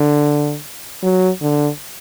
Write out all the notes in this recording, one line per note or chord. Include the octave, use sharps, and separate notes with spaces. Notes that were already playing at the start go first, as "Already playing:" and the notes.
Already playing: D3
F#3
D3